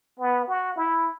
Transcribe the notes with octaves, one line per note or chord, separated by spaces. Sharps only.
B3
F#4
E4